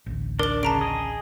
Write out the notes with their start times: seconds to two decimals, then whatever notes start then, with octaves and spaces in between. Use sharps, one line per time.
0.06 A1 D2
0.39 D4 A#4 D5 G7
0.63 C#3 A5 A#5 D7
0.81 G#4 D#5